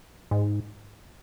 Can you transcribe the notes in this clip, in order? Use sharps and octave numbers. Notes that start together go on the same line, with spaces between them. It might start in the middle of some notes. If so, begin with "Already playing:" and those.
G#2